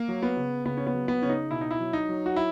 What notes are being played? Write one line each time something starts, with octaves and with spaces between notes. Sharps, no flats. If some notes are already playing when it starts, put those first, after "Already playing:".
Already playing: A#3
F#3
B3
C#3
C#3 B3
C#4
B3
F#3
B3
C#3 C#4
D#4
B2 E4
D#4
E4
F#3
D#4
F#3
F#4
E4